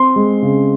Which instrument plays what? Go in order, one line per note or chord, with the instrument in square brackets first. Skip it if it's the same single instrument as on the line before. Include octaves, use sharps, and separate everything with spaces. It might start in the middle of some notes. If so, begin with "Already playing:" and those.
Already playing: [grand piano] C4 C6
G#3
C#3